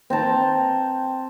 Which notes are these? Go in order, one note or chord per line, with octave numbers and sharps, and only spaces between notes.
C4 G5 A5 A#5